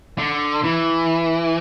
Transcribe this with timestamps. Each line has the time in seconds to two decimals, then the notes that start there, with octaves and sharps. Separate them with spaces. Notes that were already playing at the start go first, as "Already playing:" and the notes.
0.18 D3
0.64 E3